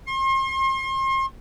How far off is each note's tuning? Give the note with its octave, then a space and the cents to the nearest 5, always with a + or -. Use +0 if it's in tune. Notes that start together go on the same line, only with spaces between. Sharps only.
C6 +40